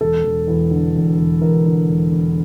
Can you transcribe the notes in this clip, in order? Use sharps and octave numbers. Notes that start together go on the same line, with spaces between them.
E1 A4
E1
E2
D3
E1
E1
E2 A#4
D3
E1
E1